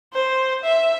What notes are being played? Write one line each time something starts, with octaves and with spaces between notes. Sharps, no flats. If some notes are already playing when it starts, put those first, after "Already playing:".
C5
E5